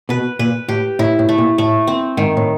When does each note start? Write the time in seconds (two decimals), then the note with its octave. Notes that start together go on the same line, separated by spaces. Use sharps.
0.09 B2 B4
0.39 A#2 B4
0.68 A2 G4
0.99 A2 E4
1.19 A2
1.29 A3
1.38 A#2
1.58 A2 A3
1.87 C4
2.17 G#2 D#3
2.37 A2